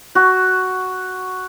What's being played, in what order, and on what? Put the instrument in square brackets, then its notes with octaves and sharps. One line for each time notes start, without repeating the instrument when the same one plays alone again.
[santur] F#4